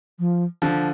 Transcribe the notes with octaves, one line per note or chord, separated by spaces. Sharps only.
F3
D3 F3